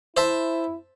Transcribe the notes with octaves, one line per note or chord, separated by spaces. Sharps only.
E4 C5 E5 A5